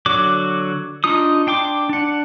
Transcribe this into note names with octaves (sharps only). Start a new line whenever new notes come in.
D3 F#3 F#4 D6
D4 D#4 F4 D#6
D4 G5 C6 D6
D4 F#5